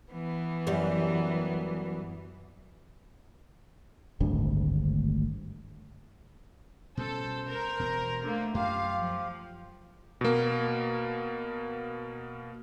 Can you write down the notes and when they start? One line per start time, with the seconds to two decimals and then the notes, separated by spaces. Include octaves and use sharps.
0.13 E3 B3
0.67 F#2 G3
4.20 D1 G#1 D2 G2
6.97 B2 G3 C#4 A4 C5
7.48 A#4 A#5
7.80 E1 B2
8.23 D3 A3 A#3
8.54 F#2 F4 G4 F5
8.95 F3
10.21 B2 A#3